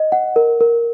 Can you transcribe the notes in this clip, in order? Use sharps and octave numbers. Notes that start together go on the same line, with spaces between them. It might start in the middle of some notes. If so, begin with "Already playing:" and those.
Already playing: D#5
F#5
A#4
A#4